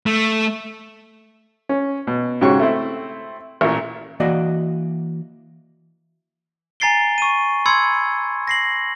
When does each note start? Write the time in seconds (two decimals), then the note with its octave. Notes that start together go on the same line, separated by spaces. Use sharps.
0.06 A3
1.69 C#4
2.07 B2
2.41 G#2 C#3 F#4 G4 C#5 C#6
2.59 A3 C4 E4
3.61 A1 A#2
4.20 E3 A#3 F#4 D5 D#5
6.80 G#5 A#5 A6 C7 D7 G7
7.18 C#6 D#7
7.66 B5 C6 E6 G#6 C#7
8.47 A#6 C7 F#7